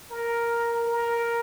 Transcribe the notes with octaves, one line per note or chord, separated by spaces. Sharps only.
A#4
A#4